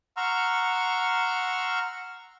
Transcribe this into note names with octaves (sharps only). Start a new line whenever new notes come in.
F#5 A#5 C6 C#6 E6 F6